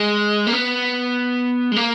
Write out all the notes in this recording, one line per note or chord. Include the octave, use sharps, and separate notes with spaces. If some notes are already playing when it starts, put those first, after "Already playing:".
Already playing: G#3
A#3
B3
G#3
A#3